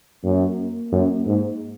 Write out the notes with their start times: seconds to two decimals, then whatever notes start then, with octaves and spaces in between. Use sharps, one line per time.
0.24 F#2 A#3
0.92 F#2
1.26 G#2